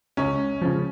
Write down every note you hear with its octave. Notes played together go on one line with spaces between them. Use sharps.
C#2 C#4
C#3 F3